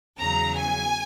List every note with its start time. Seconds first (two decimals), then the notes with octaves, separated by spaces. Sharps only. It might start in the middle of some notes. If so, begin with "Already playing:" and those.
0.19 E2 C#3 F#3 A#5
0.56 G#5